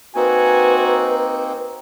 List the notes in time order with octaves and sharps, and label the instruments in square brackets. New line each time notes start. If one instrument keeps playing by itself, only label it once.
[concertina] A#3 C4 D#4 [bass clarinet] F#4 [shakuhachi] B4 [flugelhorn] G#5